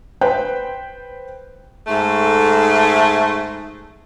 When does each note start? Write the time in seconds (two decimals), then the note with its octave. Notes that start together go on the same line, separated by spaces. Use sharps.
0.21 B4 C5 G5
1.88 G#2 A3